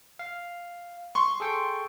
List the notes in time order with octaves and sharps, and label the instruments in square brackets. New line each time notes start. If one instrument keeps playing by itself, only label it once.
[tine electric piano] F5
[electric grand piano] C6 C#6
[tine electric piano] G#4 A4 G5